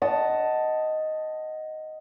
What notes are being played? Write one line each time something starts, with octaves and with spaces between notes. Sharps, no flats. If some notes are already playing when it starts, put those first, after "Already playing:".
D#5 F#5 A5